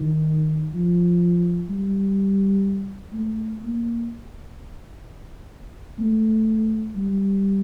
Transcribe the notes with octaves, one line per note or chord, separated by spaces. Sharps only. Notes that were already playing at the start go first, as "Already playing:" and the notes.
Already playing: D#3
F3
G3
A3
A#3
A3
G3